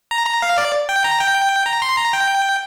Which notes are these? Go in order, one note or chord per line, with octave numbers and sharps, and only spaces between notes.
A#5
A#5
F5
D5
G5
A#5
G5
A#5
C6
A#5
G5